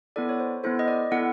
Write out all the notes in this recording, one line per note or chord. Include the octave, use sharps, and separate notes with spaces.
B3 E4 A4 D5
C#5
C5
B3 E4 A4 C5
D#5
D5
B3 E4 A4 F#5